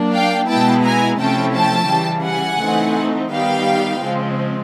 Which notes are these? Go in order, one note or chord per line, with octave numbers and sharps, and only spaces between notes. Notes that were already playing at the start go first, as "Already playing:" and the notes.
Already playing: F#3 A#3 D4
F5 G5
B2 G#3 B3 E4 G5 A5
G#5 A#5
C3 F3 A3 C#4 E4 G5 A5
G5 A5
C#3 E3 G3
F#5 G#5
E3 A3 C4 D#4
D#3 G3 B3 D#4 F5 G5
C#3 F3 G#3 C4